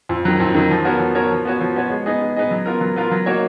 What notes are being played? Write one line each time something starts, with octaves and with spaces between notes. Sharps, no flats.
F2
D#3 F#3
F2
D#3 F#3
F3
B3 F#4 A#4 C#5
F3
B3 F#4 A#4 C#5
F3
B3 F#4 C#5
F3
B3 F#4 C#5
G#3
B3 D#4 G#4 D#5
G#3
B3 D#4 G#4 D#5
F#3
B3 F4 A#4
F#3
B3 F4 A#4
F#3
A#3 D#4 F#4 C#5